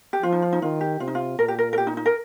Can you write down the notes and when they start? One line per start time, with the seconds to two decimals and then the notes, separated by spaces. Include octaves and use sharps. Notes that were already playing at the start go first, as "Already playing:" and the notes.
0.13 G4
0.23 F3 F4
0.33 D#4
0.42 F4
0.53 D#4
0.62 D#3 F4
0.81 G4
1.00 C3 F4
1.08 D#4
1.15 F4
1.39 A#2 A#4
1.48 G4
1.59 A#4
1.73 A#4
1.78 G4
1.87 D#4
1.97 D#4
2.06 A#4